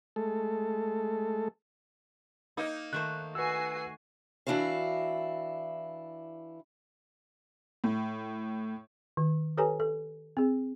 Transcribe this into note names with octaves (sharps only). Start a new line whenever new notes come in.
G#3 A3 A4
A#3 D#4
D#3 A3 C5 F#6
F#4 B4 G#5 E6 C7
E3 C4 D4 E4 F#4 F5
A2
D#3
G4 A4 B4 C#5 G#5 A#5
A4
C4 G#4